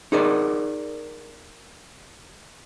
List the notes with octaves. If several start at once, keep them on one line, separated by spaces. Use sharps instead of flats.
D#4 G#4 A#4 D5